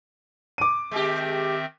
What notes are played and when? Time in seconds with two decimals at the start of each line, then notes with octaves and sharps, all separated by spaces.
0.58 D6 D#7
0.91 D#3 G#3 C4 G4 E5